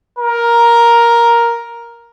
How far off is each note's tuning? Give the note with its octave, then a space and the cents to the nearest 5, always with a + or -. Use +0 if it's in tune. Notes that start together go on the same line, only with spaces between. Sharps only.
A#4 +10